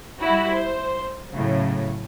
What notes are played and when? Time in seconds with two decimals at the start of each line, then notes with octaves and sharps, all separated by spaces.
0.19 G3 E4 F#4
0.52 C5
1.30 A2 C#3 F#3